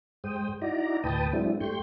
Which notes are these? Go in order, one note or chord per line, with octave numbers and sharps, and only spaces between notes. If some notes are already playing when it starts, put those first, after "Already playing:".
G2 G#3 C5 G5 D#6
D#4 E4 F#4 D5 A#5
D2 A2 B4 G5 A5 D#6
F#3 G#3 C4 D4 E4
G2 A3 G4 C6 C#6 G6